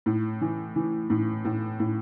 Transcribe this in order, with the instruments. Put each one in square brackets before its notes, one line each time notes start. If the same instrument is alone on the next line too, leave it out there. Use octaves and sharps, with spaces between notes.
[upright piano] A2
E3
E3
A2
A2
A2